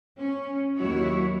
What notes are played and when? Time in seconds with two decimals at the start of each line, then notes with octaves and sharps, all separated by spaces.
0.17 C#4
0.76 D#2 F#3 E4 F#4 C#5